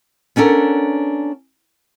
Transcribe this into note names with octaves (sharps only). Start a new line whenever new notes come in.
B3 C#4 D4 A4 A#4